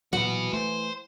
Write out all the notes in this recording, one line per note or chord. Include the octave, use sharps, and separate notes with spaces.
A#2 E3 F#3 F#4 B4 F#5
A3 C5